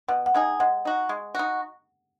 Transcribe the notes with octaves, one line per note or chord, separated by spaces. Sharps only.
B2 F#5
F#5
G#3 D#4 G#4
G#3 F#5
D#4 F#4
G#3
D#4 F#4